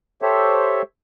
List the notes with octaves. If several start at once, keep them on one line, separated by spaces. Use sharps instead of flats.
G4 A4 C5 C#5 E5